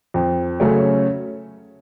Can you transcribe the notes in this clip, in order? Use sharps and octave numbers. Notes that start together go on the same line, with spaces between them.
F2
C#3 F#3 A3 C#4